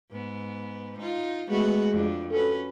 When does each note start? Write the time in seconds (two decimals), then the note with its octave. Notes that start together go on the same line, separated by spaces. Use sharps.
0.11 G#2 B3
0.98 D#4 F4
1.50 G#3 A3 B3 F#4
1.91 F2 D4
2.31 C#4 F#4 A4 B4